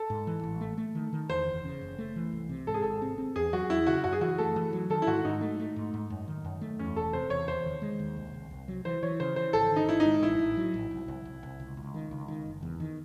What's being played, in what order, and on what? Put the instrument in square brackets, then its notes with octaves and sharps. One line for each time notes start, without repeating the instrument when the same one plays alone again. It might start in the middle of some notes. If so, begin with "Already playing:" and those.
Already playing: [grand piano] A4
[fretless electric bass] G#2
E3
A1
A3
A3
D#3
D#3
[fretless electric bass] E2 [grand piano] C5
[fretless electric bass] F#1
C#3
F#1
A3
E3
C2
C3
[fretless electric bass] G#2 [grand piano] A4
[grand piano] G#4
[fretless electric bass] G#1 [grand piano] A4
[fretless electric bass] C4
C4
[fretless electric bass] E2 [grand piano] G#4
[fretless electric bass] F#3 [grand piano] F#4
[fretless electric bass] E2 [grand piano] E4
[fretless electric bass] C#3 [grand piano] F#4
[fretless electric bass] F#2 [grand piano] F#4
[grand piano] G#4
[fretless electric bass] E3 [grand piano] F#4
[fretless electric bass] A3 [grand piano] A4
[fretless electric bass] E3
F#3
[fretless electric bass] D#3 [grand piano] A4
[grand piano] E4
[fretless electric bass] G#2 [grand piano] F#4
[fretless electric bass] G#2 [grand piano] D#4
[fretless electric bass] A3
A3
G#2
G#2
F#2
D#3
F#2
A3
[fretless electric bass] E2 [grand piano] C#4
[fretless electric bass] E1 [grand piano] A4
[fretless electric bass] C3 [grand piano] C5
[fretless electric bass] E2 [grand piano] C#5
[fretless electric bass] D#2 [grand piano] C5
[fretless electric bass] D#3
G#3
D#2
C2
C2
C2
F#3
[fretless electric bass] E3 [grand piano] C5
[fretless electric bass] E3 [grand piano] C#5
[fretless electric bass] C#3 [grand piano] C5
[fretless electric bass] E3 [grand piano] C5
[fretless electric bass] G#1 [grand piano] A4
[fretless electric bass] D#3
[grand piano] D#4
[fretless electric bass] G#1 [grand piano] E4
[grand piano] D#4
[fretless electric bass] G#2
[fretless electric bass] A1 [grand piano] E4
[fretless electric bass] A1
F#3
A1
C2
C2
C2
C2
C#2
C#2
D#3
C#2
D#3
F#1
E2
D#3